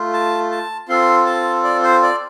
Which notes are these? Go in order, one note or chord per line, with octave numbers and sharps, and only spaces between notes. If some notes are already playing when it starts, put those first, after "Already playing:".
Already playing: A3 F4
A5
A5
C4 F4 A4 C6
A5
D5
C5
D5